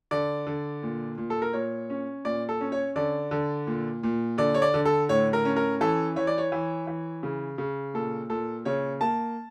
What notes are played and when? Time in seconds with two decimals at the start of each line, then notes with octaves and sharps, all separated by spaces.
0.11 D3 D5
0.47 D3
0.83 A#2
1.18 A#2
1.30 A4
1.42 A#4
1.53 A#2 C#5
1.90 C#4
2.25 A#2 D5
2.49 A4
2.61 C#4
2.72 C#5
2.96 D3 D5
3.31 D3
3.67 A#2
4.03 A#2
4.38 D3 D5
4.54 C#5
4.62 D5
4.74 D3
4.85 A4
5.09 A2 C#5
5.33 A#4
5.45 C#4
5.56 A#4
5.81 E3 A4
6.16 E3 C#5
6.27 D5
6.38 C#5
6.52 E3
6.87 E3
7.23 C#3
7.58 C#3
7.94 A#2 A4
8.30 A#2 A4
8.65 C#3 C#5
9.01 A#3 A5